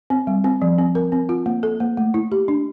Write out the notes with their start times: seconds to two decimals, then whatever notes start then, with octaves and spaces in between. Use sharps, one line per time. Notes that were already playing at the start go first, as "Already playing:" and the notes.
0.10 C4
0.27 G3
0.44 C4
0.62 F3
0.78 C4
0.95 A#4
1.12 C4
1.29 F4
1.46 A#3
1.63 A4
1.80 A#3
1.97 A3
2.14 E4
2.32 G4
2.48 D4